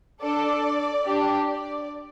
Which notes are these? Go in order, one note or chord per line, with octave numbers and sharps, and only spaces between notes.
D4 A4 D5
D4 G4
D5